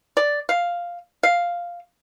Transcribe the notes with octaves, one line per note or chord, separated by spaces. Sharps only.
D5
F5
F5